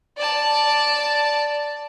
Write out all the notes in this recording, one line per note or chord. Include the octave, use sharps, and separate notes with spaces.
D5 A5